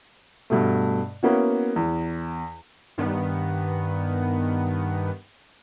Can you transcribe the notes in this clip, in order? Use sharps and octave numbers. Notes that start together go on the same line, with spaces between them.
G2 B2 A3
A#3 B3 C#4 E4 F#4
E2
G2 D#3 B3